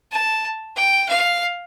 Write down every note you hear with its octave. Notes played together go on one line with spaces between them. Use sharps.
A5
G5
F5